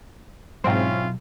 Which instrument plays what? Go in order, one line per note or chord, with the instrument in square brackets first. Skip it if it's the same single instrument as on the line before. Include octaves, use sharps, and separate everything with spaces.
[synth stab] G#2 C4 [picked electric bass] B2 F#3 [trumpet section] C#4 E4 F4